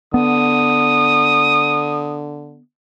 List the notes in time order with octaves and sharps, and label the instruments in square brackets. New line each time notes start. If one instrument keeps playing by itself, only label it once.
[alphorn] D3 [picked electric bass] B3 [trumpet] D#6